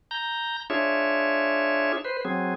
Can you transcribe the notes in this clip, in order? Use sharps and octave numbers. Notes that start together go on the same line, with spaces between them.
A#5 G6
D4 F4 G#4 C#5 E5
B4 C5
F#3 C4 G#4